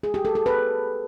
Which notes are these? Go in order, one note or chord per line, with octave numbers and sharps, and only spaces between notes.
G#4
G4
A4
A4
B4